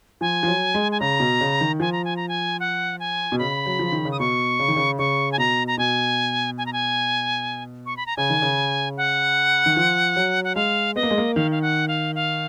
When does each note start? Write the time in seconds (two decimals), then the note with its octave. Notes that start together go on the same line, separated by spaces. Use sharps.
0.21 F3 G#5
0.43 F3
0.48 F#3
0.74 G#3
0.92 G#5
1.00 C#3 A#5
1.20 B2
1.41 C#3
1.61 D#3
1.80 F3 G#5
1.92 A#5
2.05 G#5
2.16 A#5
2.29 G#5
2.60 F#5
3.00 G#5
3.32 B2
3.39 C#3 B5
3.66 F#3
3.79 F3
3.92 D#3
4.05 C#3
4.12 D#6
4.20 B2 C#6
4.59 C#3
4.68 D#3
4.76 C#3
4.99 C#3 C#6
5.32 G#5
5.38 B2 A#5
5.67 A#5
5.78 B2 G#5
6.58 G#5
6.66 A#5
6.73 G#5
7.86 C#6
7.97 B5
8.06 A#5
8.17 C#3 G#5
8.30 D#3
8.42 C#3
8.97 F#5
9.66 D#3
9.76 F3
10.16 F#3
10.44 F#5
10.55 G#3 F5
10.96 B3 D#5
11.03 A#3
11.10 G#3
11.18 A#3
11.35 D#3 F5
11.51 F5
11.62 F#5
11.88 F5
12.15 F5